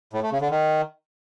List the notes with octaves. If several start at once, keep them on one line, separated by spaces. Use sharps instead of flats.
A2
A3
C#3
D3
D#3